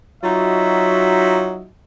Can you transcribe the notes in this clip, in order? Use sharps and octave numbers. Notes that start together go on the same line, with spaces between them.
F#3 D#4 F4 F#4 D#5 E5